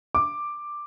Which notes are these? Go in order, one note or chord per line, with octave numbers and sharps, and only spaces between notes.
D6